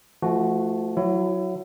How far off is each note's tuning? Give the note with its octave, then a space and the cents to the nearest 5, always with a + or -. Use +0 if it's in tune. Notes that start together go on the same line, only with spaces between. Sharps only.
F3 -30 A3 +0 F#4 +0
F#3 +0 E4 +25